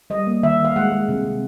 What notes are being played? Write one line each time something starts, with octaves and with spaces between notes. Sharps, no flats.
G3 D#5
A#3
D#3 E5
D#3 F5
G#3 F#5
G#3
C3
C3